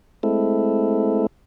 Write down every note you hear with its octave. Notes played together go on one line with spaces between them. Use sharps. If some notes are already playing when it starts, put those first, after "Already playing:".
G#3 A3 C4 E4 A4